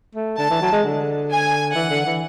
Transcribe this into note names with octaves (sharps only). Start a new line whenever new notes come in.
A3
D3 A5
E3
F#3
G#3
D3
G#5
E3 F#5
D3
E3